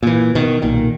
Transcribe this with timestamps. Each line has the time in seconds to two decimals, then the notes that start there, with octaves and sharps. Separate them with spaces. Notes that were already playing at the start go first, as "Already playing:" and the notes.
0.03 A#2 E3
0.35 B2 D#3
0.62 B1 A#2 D#3